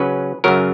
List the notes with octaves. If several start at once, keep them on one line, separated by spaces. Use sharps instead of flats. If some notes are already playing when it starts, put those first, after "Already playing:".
Already playing: C#3 F#3 C#4 B4
F#2 C#3 F#3 A#4